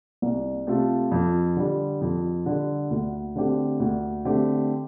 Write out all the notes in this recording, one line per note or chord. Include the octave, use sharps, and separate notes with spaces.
C2
C3 A3 F4 A4
F2
D3 G3
F2
D3 G3
D2
D3 A3 C4 G4
D2
D3 A3 C4 G4